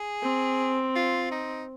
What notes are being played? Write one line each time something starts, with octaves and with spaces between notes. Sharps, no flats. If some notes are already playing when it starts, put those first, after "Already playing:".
Already playing: G#4
C4
F4
D#4